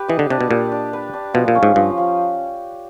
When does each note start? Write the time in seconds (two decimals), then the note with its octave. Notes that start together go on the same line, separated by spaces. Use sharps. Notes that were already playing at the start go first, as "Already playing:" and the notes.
Already playing: G4 B4
0.08 E3 D#5
0.19 D3
0.30 C3 D4
0.41 B2
0.50 A#2 G4
0.72 D4
0.93 B4
1.14 D4
1.34 B2 F3
1.48 A#2
1.55 C#4
1.63 G#2
1.76 G2 F3
1.98 F3